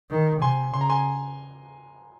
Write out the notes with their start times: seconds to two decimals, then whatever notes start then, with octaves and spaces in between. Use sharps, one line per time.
0.10 D#3
0.41 C3 G#5 C6
0.74 C#3 C6
0.81 A#5
0.90 G#5 C6